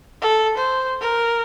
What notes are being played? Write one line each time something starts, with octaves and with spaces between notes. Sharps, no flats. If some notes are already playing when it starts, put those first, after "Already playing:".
A4
C5
A#4